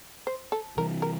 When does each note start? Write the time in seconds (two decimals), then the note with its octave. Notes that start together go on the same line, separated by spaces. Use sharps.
0.27 C5
0.52 A4
0.77 C3 E3 G3 A#4
1.02 A#4